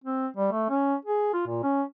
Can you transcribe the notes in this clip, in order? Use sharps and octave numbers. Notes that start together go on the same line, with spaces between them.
C4
G3
A3
C#4
G#4
F4
A#2
C#4